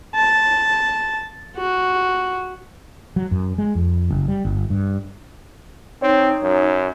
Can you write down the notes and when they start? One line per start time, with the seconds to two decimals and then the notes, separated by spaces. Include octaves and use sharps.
0.15 A5
1.57 F#4
3.16 F#3
3.31 F#2
3.58 G#3
3.75 F2
4.10 F#1
4.28 G3
4.45 G1
4.70 G2
6.02 C4 D#4 C#5
6.42 F#2